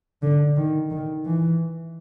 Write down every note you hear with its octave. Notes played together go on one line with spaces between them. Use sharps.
D3
D#3
D#3
E3